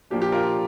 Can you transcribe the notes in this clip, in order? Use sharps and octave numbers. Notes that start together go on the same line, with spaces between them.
A#2 F3 A#3 D4 G4
G4
F4 A#4
F4